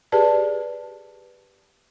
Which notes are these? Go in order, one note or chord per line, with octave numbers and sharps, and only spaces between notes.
G4 G#4 B4 D5 A5